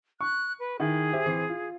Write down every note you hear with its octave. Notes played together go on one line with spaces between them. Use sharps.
C#6 F#6
B4
D#3 E4 G#4
G4 C5 E5
E3 C4 C7
F4